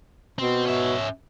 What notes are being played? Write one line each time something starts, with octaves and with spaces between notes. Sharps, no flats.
B2 C4
C#4 E5